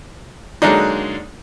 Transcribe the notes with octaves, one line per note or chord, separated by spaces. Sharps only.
D3 F#3 G#3 A#3 D4 D#4